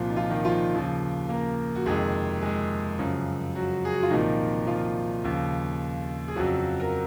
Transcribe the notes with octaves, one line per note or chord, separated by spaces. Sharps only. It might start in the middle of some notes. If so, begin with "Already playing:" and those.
Already playing: C2 A#2 F3 F4
D#4
F3 F4
D#3 D#4
F3 F4
D#2 C#3 F3
A#3 A#4
F#4
F2 C3 D#3 G#3 G#4
G#3 G#4
F#2 C#3 F3
F#3 F#4
G#4
F#4
F4
C2 A#2 D#3 F3 D#4
F3 F4
D#2 C#3 F3
G#4
F2 C#3 F3 F#3 F#4
A#4